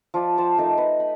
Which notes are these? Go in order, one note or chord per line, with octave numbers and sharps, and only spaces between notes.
F3 D5 E5
C5 G5 A5
A3 D#4 A#4
B4 F#5
B5